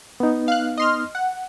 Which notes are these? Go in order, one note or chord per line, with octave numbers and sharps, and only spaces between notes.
B3 D#4
F5 F#6
D#5 C6 F6
F#5